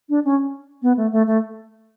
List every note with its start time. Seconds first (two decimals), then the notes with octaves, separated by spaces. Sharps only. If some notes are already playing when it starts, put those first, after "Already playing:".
0.09 D4
0.25 C#4
0.82 B3
0.97 A3
1.12 A3
1.27 A3